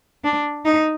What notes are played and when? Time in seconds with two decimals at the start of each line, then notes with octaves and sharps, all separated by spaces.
0.24 D4
0.65 D#4